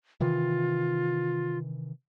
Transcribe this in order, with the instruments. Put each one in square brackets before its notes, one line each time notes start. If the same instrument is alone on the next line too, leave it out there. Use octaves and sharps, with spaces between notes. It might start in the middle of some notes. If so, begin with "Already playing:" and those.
[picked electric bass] C3 D#3 E3 [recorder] F4